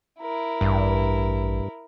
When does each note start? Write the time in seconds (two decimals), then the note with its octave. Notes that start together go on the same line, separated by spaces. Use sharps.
0.21 E4 A#4
0.61 A1 G2